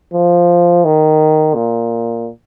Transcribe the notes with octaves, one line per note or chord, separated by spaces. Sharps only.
F3
D#3
A#2